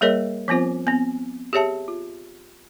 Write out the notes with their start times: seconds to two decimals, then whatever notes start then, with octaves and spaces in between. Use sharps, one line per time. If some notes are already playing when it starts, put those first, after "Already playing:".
0.01 G3 A#3 G#4 A#4 C#5 D#5
0.48 F3 B3 C4 F4 C5
0.87 B3 C4
1.53 G4 G#4 C#5 E5 A5
1.88 F4